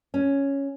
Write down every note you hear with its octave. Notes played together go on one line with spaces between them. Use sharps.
C#4